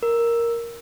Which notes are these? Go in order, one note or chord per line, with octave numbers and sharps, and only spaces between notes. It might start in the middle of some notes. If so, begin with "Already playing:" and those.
A#4